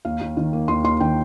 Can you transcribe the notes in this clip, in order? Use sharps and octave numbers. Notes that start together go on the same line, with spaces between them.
D#2 F5
D#2
D#3
A#3
D#2 C6
D#2 C6
D#3 G5